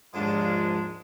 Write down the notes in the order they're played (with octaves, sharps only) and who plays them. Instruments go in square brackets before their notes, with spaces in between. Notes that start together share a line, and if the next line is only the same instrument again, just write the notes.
[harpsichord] A#1 D#2 G#2 [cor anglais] G#3 [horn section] D4 F4